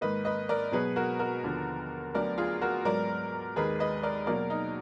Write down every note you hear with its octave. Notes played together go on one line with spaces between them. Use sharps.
G#2 D#3 A#3 B4 D#5
B4 D#5
A#4 D5
B2 F#3 B3 G#4 B4
F#4 A#4
F#4 A#4
D#2 D3 F3 B3
D2 D3 F#3 B3 A#4 D5
F4 G#4
F#4 A#4
G#2 F#3 B3 A#4 D5
D#2 D#3 G#3 G#4 B4
B4 D#5
A#4 D5
B2 F#3 A#3 A#4 D5
D#4